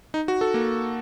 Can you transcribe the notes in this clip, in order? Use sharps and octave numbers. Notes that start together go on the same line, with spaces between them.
D#4
F#4
A4
A#3